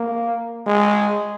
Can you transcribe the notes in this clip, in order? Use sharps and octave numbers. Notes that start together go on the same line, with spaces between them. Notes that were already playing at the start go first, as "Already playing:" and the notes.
Already playing: A#3
G#3